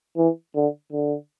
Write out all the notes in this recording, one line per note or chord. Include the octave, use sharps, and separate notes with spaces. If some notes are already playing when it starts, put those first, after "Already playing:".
E3
D3
D3